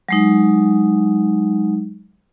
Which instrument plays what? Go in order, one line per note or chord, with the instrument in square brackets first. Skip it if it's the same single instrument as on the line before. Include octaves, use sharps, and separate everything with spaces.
[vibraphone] F#3 G#3 D#4